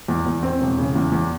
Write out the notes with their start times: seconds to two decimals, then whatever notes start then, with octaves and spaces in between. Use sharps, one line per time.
0.08 E2
0.26 E2
0.43 C4
0.61 E1
0.78 C#3
0.96 E2
1.12 E2